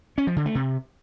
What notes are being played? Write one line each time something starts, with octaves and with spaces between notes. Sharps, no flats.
C#4
F3
D3
A3
C3